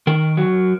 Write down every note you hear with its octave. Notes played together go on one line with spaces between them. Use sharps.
D#3 A#4
F#3